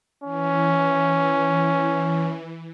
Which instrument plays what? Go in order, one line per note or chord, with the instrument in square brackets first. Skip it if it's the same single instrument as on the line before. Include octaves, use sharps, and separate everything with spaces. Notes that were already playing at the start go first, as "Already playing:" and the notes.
[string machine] E3 [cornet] C#4